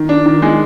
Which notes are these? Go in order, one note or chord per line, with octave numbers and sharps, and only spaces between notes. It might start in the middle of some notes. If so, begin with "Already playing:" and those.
Already playing: D#3
D4
D#3
G#3